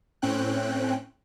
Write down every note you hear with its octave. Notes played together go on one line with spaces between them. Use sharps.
A2 C4 C#4 G5 F#6